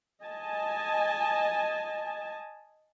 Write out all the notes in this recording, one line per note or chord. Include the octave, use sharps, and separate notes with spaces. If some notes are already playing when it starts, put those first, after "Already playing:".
D#5 G#5 A5